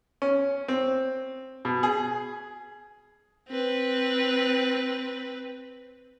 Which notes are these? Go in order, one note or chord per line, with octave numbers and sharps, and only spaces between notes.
C#4
C4
B2
G#4
C4 B4